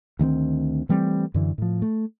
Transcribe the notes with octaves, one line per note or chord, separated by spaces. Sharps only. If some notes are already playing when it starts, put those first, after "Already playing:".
D2 D#3 G3 C4
E3 G3 A3 C4
F#2 D3 E3
A2 F3
A3